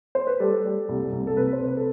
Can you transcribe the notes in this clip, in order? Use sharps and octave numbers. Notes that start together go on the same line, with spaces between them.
C5
B4
G3 A4
G3
C2
C2
A4
C3 B4
C5
C3
B4
A4